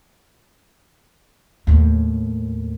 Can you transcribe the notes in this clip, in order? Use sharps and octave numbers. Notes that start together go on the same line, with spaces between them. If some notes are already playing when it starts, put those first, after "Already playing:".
D#2 A2